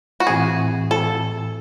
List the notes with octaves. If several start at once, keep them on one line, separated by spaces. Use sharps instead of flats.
F#4
A2 E3 C4 E4 G#4
A4